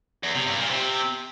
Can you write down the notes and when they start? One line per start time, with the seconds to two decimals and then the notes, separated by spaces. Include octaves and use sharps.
0.23 E2
0.35 C3
0.47 G2
0.58 A#2
0.70 C3